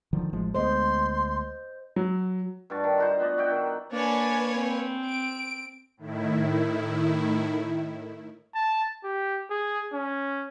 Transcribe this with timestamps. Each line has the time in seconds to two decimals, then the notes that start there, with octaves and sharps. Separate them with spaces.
0.13 D3 D#3 F3
0.33 A1 F3 G#3
0.55 D2 G#3 B3 C5 D#5 C6
1.96 F#3
2.70 G2 F#4 A5
2.84 D#3
2.98 F4 F#4 C5
3.20 B3 D5 D#5
3.38 F#4 E5 F#5 G5
3.50 D#3
3.93 A#3 D4 B4 C#5 G#5
4.56 C4
5.07 D7
5.97 A2 D#3 E4
8.55 A5
9.04 G4
9.50 G#4
9.93 C#4